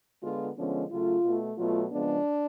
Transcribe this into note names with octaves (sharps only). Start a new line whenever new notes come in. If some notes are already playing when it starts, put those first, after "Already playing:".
D3 G#3 B3 F4
D3 F3 G#3 B3 C#4
C#3 F#3 A3 F4
B2 A3
B2 F#3 A3 F4
C#3 F3 G#3 B3 D4